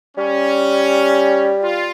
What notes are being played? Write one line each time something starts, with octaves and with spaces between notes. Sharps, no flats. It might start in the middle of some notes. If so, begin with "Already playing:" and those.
G3 C#4
F4